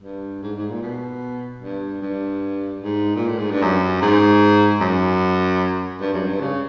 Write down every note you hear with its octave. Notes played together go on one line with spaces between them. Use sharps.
G2
G#2
G#2
A#2
B2
G2
G2
G#2
A#2
A2
G#2
G2
F#2
G#2
F#2
G2
F#2
G2
C#3